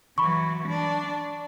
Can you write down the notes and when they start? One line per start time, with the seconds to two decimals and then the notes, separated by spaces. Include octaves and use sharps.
0.18 E3 F#3 B5 C#6
0.68 D4